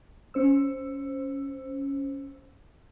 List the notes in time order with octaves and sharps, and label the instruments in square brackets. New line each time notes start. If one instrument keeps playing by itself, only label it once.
[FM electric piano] C#4 C5 E6